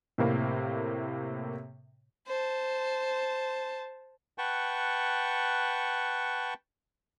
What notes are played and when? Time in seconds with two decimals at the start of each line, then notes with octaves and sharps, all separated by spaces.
0.18 A2 C3 A#3
2.27 C5 A5
4.38 B4 F#5 G5 A5 C#6